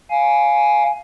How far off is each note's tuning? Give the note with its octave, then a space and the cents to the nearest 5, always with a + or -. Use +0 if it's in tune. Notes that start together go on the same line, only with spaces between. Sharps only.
F5 +0 G#5 +10